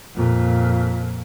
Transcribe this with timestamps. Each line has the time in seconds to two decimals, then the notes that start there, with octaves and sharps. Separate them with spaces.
0.14 F2 A#2